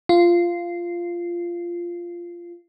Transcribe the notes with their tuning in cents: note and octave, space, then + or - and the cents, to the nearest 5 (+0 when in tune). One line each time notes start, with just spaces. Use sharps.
F4 -10